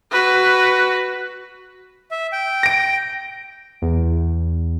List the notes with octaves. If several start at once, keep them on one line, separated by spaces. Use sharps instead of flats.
F#4 B4
E5
G5
A#6 D7
E2